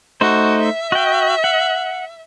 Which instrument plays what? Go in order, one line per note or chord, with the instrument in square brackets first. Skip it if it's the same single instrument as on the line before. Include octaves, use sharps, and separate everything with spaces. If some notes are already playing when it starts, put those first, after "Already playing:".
[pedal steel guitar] A3 D#4 C5 [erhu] F#4
[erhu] E5
[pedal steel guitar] F#4 G5
F#5